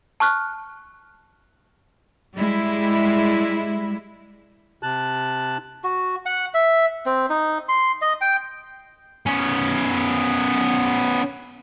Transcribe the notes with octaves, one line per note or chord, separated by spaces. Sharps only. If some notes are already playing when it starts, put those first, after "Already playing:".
A5 C#6 F6 F#6
G3 G#3 E4
C3 A5 F#6
F#4
F#5
E5
C4
D#4
C6
D#5
G5
B3 C#4